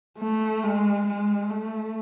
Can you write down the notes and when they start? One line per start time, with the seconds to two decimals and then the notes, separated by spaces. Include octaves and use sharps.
0.18 A3
0.63 G#3
1.07 G#3
1.50 A3